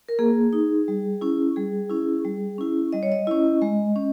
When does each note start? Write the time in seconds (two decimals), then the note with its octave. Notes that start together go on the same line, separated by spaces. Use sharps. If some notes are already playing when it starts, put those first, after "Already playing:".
0.09 A#4
0.19 A#3 G#4
0.53 D#4
0.88 G3
1.21 C#4 E4
1.56 G3 G#4
1.90 C#4 E4
2.25 G3
2.58 C#4 E4
2.92 G3 D#5
3.03 C#5
3.12 D#5
3.27 C#4 E4
3.62 G#3
3.96 C#4